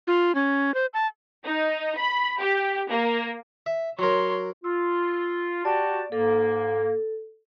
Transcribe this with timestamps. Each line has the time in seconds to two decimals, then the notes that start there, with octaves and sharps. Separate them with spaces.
0.07 F4
0.35 C#4
0.74 C5
0.94 A5
1.45 D#4
1.97 B5
2.39 G4
2.90 A#3
3.66 E5
3.99 F#3 A#4 C#5 C6
4.64 F4 E6
5.65 F#4 G4 D5 A5
6.12 G#2 A#3 A4